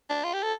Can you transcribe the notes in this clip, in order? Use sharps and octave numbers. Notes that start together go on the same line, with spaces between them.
D4
F4
G4
A4